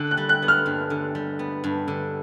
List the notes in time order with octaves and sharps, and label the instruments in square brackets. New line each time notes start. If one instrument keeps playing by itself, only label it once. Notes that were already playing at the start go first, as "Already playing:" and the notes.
Already playing: [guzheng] D3 [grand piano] F#6
[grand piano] F#6
[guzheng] G3
[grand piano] F#6
[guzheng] B3
[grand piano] F6
[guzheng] G2
D3
G3
B3
G2
D3